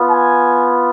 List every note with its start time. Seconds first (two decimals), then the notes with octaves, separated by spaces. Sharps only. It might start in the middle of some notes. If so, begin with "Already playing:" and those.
Already playing: B3 F4
0.10 G#5